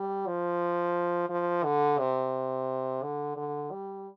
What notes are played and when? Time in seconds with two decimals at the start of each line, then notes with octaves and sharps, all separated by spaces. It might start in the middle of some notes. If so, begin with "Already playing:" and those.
Already playing: G3
0.27 F3
1.29 F3
1.64 D3
1.99 C3
3.03 D3
3.37 D3
3.72 G3